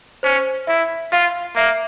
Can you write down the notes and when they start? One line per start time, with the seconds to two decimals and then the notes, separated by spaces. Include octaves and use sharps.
0.23 C#4 C5
0.67 E4 E5
1.12 F4 F5
1.56 A#3 E5